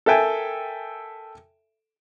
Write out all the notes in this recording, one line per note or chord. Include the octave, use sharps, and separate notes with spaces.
A4 A#4 E5 G5 G#5